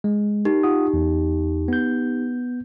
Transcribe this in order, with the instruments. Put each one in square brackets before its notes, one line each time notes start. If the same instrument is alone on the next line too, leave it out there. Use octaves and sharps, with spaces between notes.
[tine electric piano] G#3
[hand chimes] D#4 G4 [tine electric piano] A#4
[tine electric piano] F4 F#5 D#6
E2
B3 G6